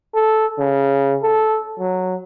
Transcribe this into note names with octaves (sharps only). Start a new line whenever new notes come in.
A4
C#3
A4
F#3